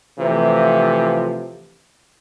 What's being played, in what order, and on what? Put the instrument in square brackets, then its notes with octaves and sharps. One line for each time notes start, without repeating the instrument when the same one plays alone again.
[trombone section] C3 E3 F3 A3 F4